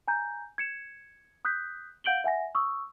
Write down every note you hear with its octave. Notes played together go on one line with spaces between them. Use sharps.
G#5 A#5 G6
G#6 C#7 E7
D#6 F#6 G6 B6
F5 F#5 G6 D7 F#7 G7
E5 F#5 G#5 A#6
C#6 D#6 E6